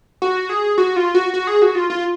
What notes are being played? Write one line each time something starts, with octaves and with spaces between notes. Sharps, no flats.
F#4
G#4
F#4
F4
F#4
F#4
G#4
F#4
F4
F4